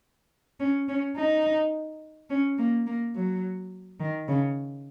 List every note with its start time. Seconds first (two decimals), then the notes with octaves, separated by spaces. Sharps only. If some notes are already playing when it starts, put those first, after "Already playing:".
0.60 C#4
0.88 C#4
1.17 D#4
2.30 C#4
2.58 A#3
2.87 A#3
3.15 F#3
4.00 D#3
4.28 C#3